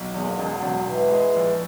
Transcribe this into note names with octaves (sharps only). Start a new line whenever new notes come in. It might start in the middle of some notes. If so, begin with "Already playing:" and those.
Already playing: B1
E2 G#3
A#3
E1 G#3
F#3
E1
G#2 E3
G#3
A#1